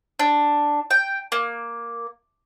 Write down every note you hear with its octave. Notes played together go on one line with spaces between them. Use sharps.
D4
G5
A#3